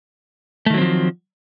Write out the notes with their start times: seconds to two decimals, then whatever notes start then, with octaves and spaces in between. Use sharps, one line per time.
0.66 A3
0.70 D#3
0.74 F#3
0.78 C4
0.81 F3